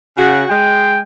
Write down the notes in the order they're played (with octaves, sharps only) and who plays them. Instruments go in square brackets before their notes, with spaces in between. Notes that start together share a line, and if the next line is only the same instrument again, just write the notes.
[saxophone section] C#3 F#4
[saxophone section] G#3 [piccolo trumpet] G5